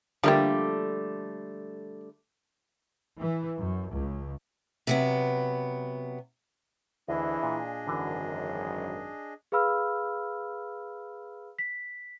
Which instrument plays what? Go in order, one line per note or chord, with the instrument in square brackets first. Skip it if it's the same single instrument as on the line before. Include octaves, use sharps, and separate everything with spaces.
[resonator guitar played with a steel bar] D3 G3 A3 [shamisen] F3 A#3 G4
[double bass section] E3
F#2
C#2
[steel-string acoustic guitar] C3 F#3 B3
[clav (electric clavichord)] D2 [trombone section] E3 E4 [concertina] D4 G#4 D#5
[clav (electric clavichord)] A#2
[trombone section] G#1 F#2 [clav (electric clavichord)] D3 E3
[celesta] G#4 B4 F5 B5 E6 F6
B6